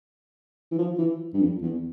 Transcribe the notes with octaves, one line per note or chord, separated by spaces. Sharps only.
E3
F3
E3
G2
F2
E2